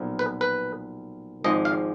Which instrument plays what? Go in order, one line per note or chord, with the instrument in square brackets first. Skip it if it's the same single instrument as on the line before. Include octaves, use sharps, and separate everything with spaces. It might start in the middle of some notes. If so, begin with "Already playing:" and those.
Already playing: [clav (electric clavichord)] B1 A#2 F3
B4
B4
G#1 G#2 F3 G#3 D#5
F5